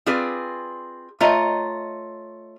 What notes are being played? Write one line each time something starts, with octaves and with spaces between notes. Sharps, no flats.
C4 F4 G#4 B4 D5
A3 F4 C#5 D#5 A#5